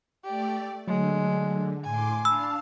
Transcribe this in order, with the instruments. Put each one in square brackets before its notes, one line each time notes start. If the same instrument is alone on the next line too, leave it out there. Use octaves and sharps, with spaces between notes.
[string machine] A3 D5 [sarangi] G4
[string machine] D3 [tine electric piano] F#3 A3 [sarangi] G#3
[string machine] A2 C6 D6 [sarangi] G#5
[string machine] D4 F5 A5 [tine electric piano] B5 [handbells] E6